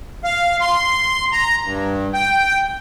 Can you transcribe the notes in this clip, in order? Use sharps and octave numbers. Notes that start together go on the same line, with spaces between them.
F5
C6
A#5
G2
G5